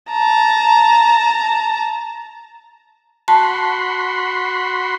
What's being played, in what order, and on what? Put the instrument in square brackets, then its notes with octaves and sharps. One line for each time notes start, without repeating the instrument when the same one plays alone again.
[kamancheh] A5 A#5
[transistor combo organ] F#4 B5 C6 [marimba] A5